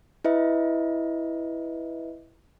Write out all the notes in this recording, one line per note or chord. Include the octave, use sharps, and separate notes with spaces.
E4 B4 D#5 E5